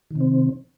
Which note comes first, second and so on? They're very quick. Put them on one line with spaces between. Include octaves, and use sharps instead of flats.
D#3 C3 C4